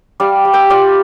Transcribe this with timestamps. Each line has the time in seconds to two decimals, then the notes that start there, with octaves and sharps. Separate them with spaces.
0.20 G3 D5 F5
0.45 G3
0.54 E5 G5
0.70 F4 D5 F5